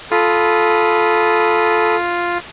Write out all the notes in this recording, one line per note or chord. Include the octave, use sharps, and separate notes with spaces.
F4 A4 B5 D#6